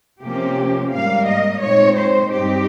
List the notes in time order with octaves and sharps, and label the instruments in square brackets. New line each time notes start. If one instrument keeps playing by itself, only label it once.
[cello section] C3 F3 A#3 C#4 G4
G#2 G3 A#3 F5
D#5
A#2 G#3 C4 D#4 C#5
C5
G2 G3 C4 D#4 G4